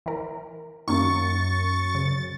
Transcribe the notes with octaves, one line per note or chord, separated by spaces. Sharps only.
E3 A#4
F#2 D#3 A#3 C#4 C#6 A6
C#3